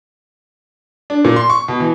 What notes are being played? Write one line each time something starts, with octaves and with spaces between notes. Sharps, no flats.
D4
A#2
C6
C#6
B2
E3